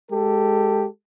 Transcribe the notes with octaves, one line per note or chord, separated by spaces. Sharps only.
G#3 G4 A4